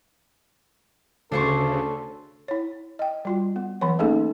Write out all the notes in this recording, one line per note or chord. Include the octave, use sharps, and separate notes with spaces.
D2 C#3 D4 A4 C5 C#6
E4 C#5
D#5 G5
G3 F4 F#4
B3
E3 F#3 B3 C#5
A3 A#3 C#4 D#4 G#4 A4